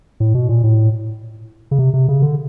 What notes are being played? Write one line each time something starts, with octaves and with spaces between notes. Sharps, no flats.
A2
B2
A#2
A2
C#3
C3
C3
C#3
D3